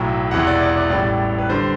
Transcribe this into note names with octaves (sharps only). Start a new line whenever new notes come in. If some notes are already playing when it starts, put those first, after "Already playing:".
Already playing: B1 A2 F#3 G5
E1 E2 C3 E3 F#5
D5
D5
D5
A1 A2 G3 D5
B4
D3 G3 C5